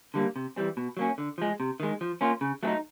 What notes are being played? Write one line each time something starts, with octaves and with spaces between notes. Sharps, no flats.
D3 G3 A#3
C3
E3 G3 C4
B2
F#3 A#3 C#4
D3
F3 G#3
C3
D#3 G#3
F3
A#3 C#4 F4
C#3
F#3 A3 C4 D#4